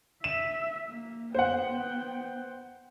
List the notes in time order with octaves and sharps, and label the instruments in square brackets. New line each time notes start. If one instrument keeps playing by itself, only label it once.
[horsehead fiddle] E5 [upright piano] E7
[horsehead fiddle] A#3
[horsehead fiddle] B3 G5 [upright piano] C5 F#5